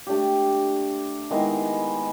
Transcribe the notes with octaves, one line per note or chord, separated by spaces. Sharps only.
A3 D4 G4
D#3 G#3 B3 E4